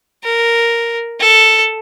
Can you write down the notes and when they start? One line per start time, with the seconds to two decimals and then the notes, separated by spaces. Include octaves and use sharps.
0.24 A#4
1.20 A4